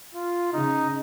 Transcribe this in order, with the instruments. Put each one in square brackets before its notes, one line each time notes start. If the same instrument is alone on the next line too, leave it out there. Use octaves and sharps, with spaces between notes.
[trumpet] F4
[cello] C#3 [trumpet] D#4